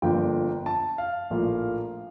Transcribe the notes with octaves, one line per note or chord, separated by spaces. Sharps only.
G1 F2 D3 F3 A#3 G5
A5
F5
A#1 A2 F3 A#3